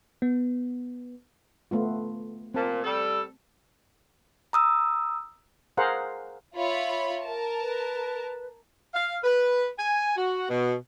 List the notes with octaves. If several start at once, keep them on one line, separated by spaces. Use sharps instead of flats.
B3
A3 B3 F4
A#2 C4 A5
G3 A4
A#5 D#6 E6
G#4 A#4 C5 F5 F#5
F4 C#5 E5 B5
A#4 A5
B4
F5
B4
G#5
F#4
B2